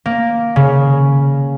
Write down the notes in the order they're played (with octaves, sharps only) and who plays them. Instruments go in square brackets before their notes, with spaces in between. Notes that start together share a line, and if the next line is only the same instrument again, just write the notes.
[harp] A#3
C#3